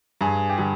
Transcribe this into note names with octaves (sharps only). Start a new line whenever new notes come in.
G2 G#4
G4
D3 G3 G#4